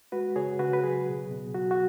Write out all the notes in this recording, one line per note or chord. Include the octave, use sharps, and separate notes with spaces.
G#3 F#4 B4
C#3 G#4 C#5
C#3 F#4 B4
B4
F#3 G#4
B2
B2
F#3 F#4
F#4